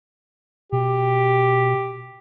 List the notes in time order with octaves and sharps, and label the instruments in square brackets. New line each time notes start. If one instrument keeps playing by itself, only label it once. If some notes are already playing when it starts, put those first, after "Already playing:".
[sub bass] B2 [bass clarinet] G4